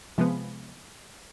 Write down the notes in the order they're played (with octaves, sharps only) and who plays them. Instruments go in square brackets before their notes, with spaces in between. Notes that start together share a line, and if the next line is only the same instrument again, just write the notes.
[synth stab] C3 F3 G#3 B3